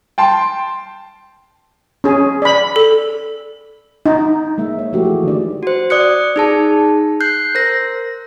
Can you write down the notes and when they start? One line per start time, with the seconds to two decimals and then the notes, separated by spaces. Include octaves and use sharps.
0.18 G5 A5 C6
2.04 C#4 G#4
2.42 D5 B5
2.76 A4
4.06 D#4
4.58 G#3 A#3 E5
4.79 C#5
4.93 E3 F3 A3 F#4 G4
5.05 G#4
5.23 D#3 D4 D5
5.63 F#4 C5
5.90 D5 D#6 F#6 C#7
6.36 D#4 G#4 A5
7.21 F#6 G6 C7
7.55 A#4 C5 A#6